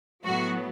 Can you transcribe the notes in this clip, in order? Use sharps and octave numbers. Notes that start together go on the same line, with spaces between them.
A2 F#3 B3 F#4